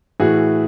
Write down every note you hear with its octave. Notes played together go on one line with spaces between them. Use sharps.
A2 E3 F#4 G#4